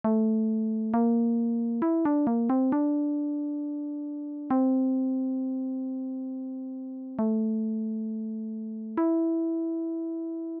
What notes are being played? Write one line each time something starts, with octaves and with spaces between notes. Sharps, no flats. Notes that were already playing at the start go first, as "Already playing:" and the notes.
A3
A#3
E4
D4
A#3
C4
D4
C4
A3
E4